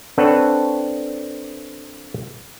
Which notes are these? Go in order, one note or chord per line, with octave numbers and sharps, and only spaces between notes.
C4 D4 A4 B4 C#5 F#5